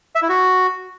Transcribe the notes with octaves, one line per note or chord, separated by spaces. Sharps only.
E5
E4
F#4